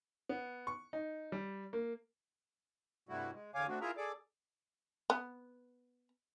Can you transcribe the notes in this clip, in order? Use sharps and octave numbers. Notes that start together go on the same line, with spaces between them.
B3
C#6
D#4
G3
A#3
G2 C3 G3 A3 E4 F#4
G#3
E2 D3 C#5 F5 G#5 D6
A3 C4 D4 F#4
E4 F4 G#4 A#4 E5 A#5
G#4 A4 D5 D6
B3